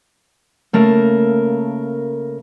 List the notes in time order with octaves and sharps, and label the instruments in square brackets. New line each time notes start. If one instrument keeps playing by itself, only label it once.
[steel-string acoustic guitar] C#3 A3 A#3 A#4 A5